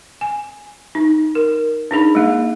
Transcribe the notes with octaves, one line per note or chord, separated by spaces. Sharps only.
G#5
D#4
A#4
D4 D#4 G#4 B5
G#3 A#3 E5